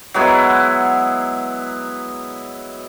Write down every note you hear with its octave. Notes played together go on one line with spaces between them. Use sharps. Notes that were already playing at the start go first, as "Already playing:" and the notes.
F#3 G#3 B3 E4